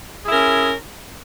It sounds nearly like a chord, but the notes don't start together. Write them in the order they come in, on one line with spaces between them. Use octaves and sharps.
G#4 E4 A#4 C#4